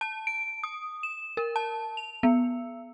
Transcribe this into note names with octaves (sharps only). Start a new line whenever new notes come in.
A5
D7
D#6
E7
A#4
A5
F7
B3